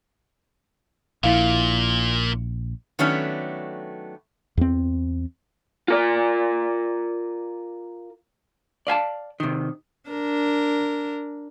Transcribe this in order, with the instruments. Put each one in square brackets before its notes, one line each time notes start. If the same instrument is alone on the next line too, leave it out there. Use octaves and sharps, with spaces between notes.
[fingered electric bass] A#1 [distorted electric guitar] A#2 [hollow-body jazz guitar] E4 F5
[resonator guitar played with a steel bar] D#3 F#3 A3 B3 C#4 D4
[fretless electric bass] E2 C4
[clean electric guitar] F4 A#4 D5
[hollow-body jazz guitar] D5 F5 G#5 A5
C3 D#3
[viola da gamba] D4 A#4